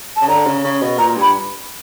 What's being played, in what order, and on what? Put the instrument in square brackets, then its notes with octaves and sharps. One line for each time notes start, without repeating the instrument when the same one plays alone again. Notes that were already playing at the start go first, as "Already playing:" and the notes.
[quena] A5
[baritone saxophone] C#3
[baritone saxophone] D3 [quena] A#5
[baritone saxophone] C#3
C#3
B2
[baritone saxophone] A#2 [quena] A#5
[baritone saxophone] G2
[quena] B5